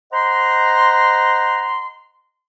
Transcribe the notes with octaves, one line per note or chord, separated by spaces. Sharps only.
C5 D#5 F#5 A#5 C6